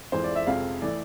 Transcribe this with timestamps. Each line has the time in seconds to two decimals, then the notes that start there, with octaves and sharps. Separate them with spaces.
0.12 F2 E3 G#3 C5
0.24 D5
0.35 E5
0.46 F2 C3 G#3 F5
0.82 E3 A3 D5